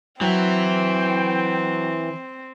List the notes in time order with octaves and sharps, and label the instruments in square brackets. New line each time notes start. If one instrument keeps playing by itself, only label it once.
[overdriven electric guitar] E3 [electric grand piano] F#3 [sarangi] C4 [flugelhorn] G5